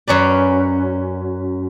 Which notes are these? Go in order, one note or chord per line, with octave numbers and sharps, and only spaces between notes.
F#2 C#4 B4 D5